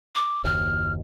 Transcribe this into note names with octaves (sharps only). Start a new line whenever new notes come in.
D6
F#1 D#2 F6